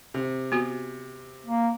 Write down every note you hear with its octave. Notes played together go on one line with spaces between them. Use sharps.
C3
B3 F#4
A#3